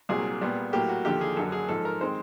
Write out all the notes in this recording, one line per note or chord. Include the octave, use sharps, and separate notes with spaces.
C2 A#2 F#3 G#4
A#2 G3 B3
A2 F#3 A#3 G4
F#4
D#2 D3 F3 G4
G#4
F#2 D3 F#3 A4
G#4
G#2 F3 G#3 A4
A#4
D#3 G#3 C4 C5